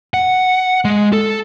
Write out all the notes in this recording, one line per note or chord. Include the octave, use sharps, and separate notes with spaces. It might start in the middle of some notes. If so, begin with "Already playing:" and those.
F#5
G#3
A4